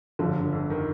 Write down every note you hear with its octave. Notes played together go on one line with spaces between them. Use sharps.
G1 D3 F3
G1
F2
D#3